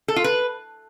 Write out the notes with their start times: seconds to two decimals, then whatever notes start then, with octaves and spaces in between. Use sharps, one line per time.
0.08 A4
0.16 F4
0.24 B4